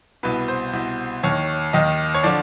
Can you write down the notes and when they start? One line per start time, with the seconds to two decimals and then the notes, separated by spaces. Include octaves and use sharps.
0.23 C2 B2 B4
0.48 C5
0.73 C2 B2
1.23 D#2 D#3 C#5
1.73 D#2 D#3 D#5
2.14 C#5
2.23 D3 F3 D5